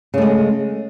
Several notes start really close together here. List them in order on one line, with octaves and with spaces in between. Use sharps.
C#3 A3 G#3